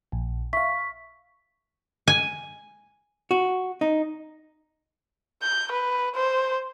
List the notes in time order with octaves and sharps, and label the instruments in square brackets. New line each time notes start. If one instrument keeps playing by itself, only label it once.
[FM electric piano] A#1
[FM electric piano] E5 F5 [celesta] C#6 B6
[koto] G#5
[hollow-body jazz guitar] F#4
D#4
[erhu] G6
B4
C5